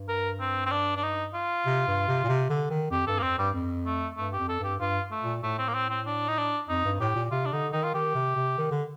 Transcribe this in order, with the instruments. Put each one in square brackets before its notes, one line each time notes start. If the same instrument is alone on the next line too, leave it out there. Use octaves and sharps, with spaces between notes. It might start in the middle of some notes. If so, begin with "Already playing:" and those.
Already playing: [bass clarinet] G2
[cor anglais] A#4
C4
C4
D4
D4
D#4
F4
[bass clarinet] C3
G2
C3
A#2
C3
D3
D#3
[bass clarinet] F2 [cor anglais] G4
[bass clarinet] G2 [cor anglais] A4
[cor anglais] A#3
[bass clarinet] F2 [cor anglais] C4
[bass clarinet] G2 [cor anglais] G3
[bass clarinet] F2
[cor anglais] A3
[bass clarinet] G2 [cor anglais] A3
[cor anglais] G4
[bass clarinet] F2
[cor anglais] A4
[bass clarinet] G2 [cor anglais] G4
[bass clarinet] G2 [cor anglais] F4
[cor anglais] A3
[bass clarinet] A#2
[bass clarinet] A2 [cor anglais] A3
[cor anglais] C4
A#3
C4
C4
D4
D#4
D4
[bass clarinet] F2 [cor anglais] D#4
[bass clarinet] G2
[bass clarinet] A2 [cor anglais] G4
[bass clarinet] A#2
[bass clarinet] C3 [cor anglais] F4
[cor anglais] D4
[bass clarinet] D3 [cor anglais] D#4
[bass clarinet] D#3 [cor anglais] D#4
[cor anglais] F4
[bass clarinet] D#3 [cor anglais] G4
[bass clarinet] C3
C3
D#3
D3